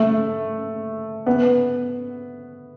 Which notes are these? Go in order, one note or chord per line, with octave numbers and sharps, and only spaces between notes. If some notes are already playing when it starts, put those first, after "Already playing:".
Already playing: A3
B3